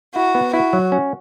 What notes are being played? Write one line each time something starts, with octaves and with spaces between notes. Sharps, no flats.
E4 F#4
B3
E4 F#4
F#3
C#4